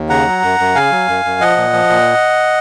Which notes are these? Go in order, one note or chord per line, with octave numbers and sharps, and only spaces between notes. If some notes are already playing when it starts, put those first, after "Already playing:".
Already playing: D#2
C#3 F#5 A#5
F#3
F#2
F#2
C#3 F5 G#5
F#3
F#2
F#2
F3 D#5 F#5
A#2
F3
A#2